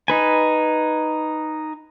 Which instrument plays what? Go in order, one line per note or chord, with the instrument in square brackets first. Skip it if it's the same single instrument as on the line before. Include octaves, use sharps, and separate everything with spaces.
[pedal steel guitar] D#4 B4 G#5